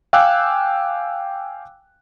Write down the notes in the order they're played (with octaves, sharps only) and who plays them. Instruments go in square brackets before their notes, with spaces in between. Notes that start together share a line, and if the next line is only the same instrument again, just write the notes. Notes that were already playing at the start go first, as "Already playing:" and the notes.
[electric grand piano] F5 G5 G#5 D6 E6 F#6